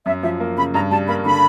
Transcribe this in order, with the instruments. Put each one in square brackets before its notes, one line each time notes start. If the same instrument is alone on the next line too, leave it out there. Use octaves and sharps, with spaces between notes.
[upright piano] F#2 [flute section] E5
[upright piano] F3 [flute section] E5
[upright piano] A#3
[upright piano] C#3 [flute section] B5
[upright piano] G2 [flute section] A#5
[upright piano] G3 [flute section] A5
[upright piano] A#3 [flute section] B5
[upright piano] D3 [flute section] B5